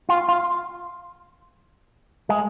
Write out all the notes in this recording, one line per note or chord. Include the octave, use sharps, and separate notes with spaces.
F4
F4
G#3